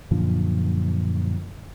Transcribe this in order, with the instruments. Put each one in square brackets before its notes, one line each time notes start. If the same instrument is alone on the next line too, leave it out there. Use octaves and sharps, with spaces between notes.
[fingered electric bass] F#2 A#2 D3 F3